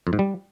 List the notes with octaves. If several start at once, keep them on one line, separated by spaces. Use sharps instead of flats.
F2
G#2
G3